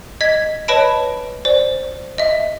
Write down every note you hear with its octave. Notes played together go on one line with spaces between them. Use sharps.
D#5 G#6 B6
B4 C#5 D#5 A5 B5 D7
C5 D5
D#5 E5